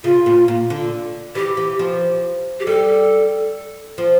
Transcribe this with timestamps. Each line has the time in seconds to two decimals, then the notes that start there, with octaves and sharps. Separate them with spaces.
0.04 C#3 F4
0.26 A#2
0.48 A#2
0.70 D3
1.35 E3 G4
1.57 E3
1.79 F3
2.60 G4
2.66 G3 A4
3.98 F3